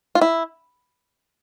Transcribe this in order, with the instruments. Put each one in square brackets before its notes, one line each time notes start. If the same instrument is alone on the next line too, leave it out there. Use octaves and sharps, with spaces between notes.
[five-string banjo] F4
E4